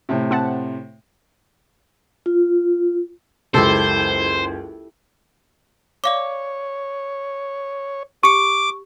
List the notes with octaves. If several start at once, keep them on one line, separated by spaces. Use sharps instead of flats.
A2 C3
C4 F#5 A5
F4
F#1 C#2 E4 G4 A4 C5
C#5 D5 F5 D6
G4 C#6 D6 C#7